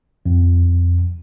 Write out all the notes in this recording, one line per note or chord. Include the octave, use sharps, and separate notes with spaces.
F2